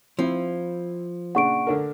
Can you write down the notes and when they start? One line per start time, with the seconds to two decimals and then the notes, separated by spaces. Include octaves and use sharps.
0.19 F3 C4 E4
1.35 A#2 C#3 D4 F#5 C#6 D7
1.67 D3 D4 A#4